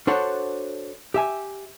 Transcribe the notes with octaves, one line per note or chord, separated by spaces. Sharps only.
D4 F#4 A4 C5 C#5 F#5
G4 E5 G#5